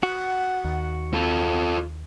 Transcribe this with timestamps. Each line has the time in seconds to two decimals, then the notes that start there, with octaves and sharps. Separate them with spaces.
0.03 F#4 F#5
0.65 D#2
1.14 C4 F4 A4